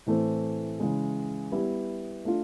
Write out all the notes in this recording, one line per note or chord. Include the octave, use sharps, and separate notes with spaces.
A2 E3 A3 C4
C#3 E3 G#3
G3 B3 E4 G4
A3 D4 F4